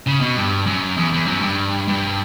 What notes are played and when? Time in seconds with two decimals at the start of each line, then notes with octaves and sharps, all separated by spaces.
0.07 C#3
0.21 B2
0.36 G2
0.66 F#2
0.97 E2
1.13 E2
1.27 F#2
1.42 G2
1.88 G2